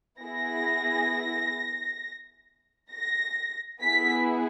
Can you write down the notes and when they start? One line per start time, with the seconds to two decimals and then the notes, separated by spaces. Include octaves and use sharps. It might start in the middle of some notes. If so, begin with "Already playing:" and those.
0.21 B3 E4 G#4 A#6
2.92 A#6
3.81 B3 E4 G#4 B6